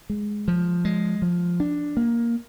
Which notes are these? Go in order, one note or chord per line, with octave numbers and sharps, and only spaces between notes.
G#3
F3
G#3
F3
D4
A#3